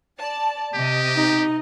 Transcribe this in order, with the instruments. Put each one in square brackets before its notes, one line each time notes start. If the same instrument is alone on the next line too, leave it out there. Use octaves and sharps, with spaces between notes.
[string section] D5 A5
[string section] C3 D#5 [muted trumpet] G4
[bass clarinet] D#4